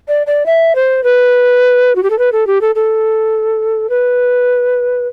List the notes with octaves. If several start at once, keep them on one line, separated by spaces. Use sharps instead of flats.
D5
D5
E5
C5
B4
F#4
G4
A4
B4
A4
G4
A4
A4
B4